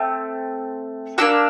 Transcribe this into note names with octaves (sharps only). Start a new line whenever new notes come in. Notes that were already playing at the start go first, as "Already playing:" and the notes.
Already playing: A3 C4
A#3 D4 F#4 E6